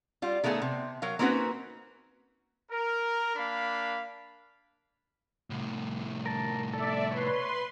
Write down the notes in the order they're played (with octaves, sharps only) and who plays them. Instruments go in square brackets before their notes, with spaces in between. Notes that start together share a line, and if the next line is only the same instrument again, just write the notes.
[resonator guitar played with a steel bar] G3 F4
D#3 A3 B3 C#4 G#4 A4
C3
F#3 A#4 F5
A#3 C4 C#4 D#4 F#4 B4
[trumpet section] A#4
A#3 D4 F5 B5
[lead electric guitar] C2 A2
[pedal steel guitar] A#4 A5
[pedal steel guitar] A4 [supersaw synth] D5 E5
[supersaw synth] B4 C6 [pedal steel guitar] C#5